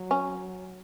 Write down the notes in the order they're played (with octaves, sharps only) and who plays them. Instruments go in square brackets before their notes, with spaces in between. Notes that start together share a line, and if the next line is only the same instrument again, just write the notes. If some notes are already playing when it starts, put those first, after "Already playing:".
Already playing: [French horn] F#3
[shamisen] C#4